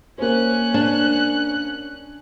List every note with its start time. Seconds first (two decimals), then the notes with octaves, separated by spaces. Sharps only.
0.18 A#3 C#4 C5 F#6
0.74 D4